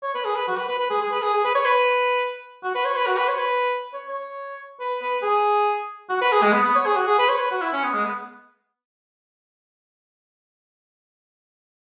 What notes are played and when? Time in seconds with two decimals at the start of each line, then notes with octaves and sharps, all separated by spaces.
0.03 C#5
0.15 B4
0.25 G#4
0.35 B4
0.47 F#4
0.58 B4
0.68 B4
0.79 B4
0.90 G#4
1.01 G#4
1.12 B4
1.22 G#4
1.33 G#4
1.45 B4
1.55 C#5
1.65 B4
2.63 F#4
2.75 B4
2.85 C#5
2.96 B4
3.07 F#4
3.17 B4
3.28 C#5
3.39 B4
3.93 C#5
4.08 C#5
4.80 B4
5.02 B4
5.23 G#4
6.09 F#4
6.21 B4
6.32 G#4
6.42 G#3
6.53 B3
6.64 B3
6.75 C#5
6.86 G#4
6.96 F#4
7.07 G#4
7.18 B4
7.29 C#5
7.39 B4
7.51 F#4
7.61 E4
7.73 C#4
7.84 B3
7.94 G#3
8.05 B3